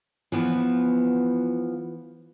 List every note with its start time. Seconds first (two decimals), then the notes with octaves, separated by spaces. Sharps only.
0.32 E3 F3 B3